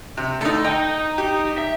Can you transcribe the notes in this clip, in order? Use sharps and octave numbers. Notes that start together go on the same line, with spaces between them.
C3
D2 D#4 A4
D#4 G5
G4
E5